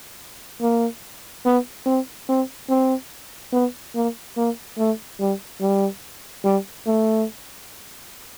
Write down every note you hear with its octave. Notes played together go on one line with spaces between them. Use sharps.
A#3
B3
C4
C4
C4
B3
A#3
A#3
A3
G3
G3
G3
A3